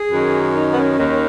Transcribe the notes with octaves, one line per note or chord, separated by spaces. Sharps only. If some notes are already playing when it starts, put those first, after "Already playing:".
Already playing: G#4
F#2 D#3
D#4
B3
C#4
D#2 D#3